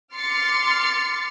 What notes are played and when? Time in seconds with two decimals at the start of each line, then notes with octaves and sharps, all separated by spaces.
0.15 C6 D6 F6 A6 C7 C#7